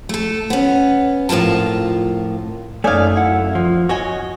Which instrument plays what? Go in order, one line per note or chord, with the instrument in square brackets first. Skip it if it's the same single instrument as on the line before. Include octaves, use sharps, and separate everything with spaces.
[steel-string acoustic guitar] A3 A4
B3 C#4
F2 A2 F4 A#4 A5
[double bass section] F#2 [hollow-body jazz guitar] A3 [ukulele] D#4 C#5 D5 [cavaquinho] F5 G#5
[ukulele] E4 F#5
[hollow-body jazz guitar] F3
[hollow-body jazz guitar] F#4 [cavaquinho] C#5 D#5 G#5